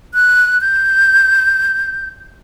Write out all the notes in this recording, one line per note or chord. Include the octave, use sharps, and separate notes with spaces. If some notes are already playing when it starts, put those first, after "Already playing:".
F#6
G6